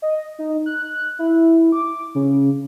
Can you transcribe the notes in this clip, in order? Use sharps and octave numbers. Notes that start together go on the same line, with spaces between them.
D#5
D#4
F#6
E4
D6
C#3